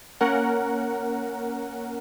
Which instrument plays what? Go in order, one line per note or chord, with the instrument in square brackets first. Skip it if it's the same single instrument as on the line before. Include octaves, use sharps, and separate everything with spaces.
[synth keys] A#3 C#4 A#4 F#5